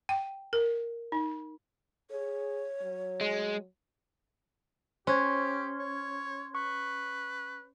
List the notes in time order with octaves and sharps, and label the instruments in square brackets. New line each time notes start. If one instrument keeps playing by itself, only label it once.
[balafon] G5
A#4
D#4
[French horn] G#4 [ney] C#5
[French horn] F#3
[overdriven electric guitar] G#3
[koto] C#4 [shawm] G4 [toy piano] C5 [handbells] C6 G#6
[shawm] C#5
[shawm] B4 [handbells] C#6